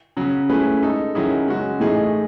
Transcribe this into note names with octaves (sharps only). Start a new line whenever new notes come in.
C#3 F#3 C#4
A3 C#4 E4 G#4 B4
G#3 D#4 A4
D#3 F#3 C#4 E4 G#4
C#3 G#3 C#4 F#4
A2 E3 A3 D#4 G#4